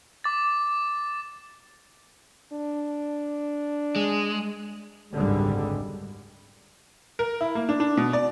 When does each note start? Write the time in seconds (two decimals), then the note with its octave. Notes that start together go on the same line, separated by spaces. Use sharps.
0.24 D6 A6
2.53 D4
3.96 G#3
5.15 G#1 C#2 F#2 D3 G3 G#3
7.19 A#4
7.41 E4
7.55 A#3
7.69 D4
7.80 D4
7.97 B2
8.13 D5